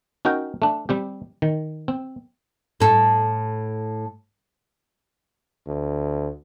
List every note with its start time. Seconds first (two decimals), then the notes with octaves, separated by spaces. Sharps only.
0.25 C#4 D#4 F#4 A#4 G5
0.62 A3 D4
0.89 G3 C4 G4
1.42 D#3
1.88 C4
2.80 A2 A4
5.67 D2